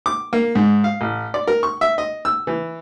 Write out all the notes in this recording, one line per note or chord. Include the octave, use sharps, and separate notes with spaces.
D6
A#3
G#2
F5
A1
D5
A#4
C#6
E5
D#5
E6
E3